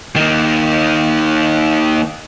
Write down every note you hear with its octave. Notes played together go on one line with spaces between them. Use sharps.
D#3 A#3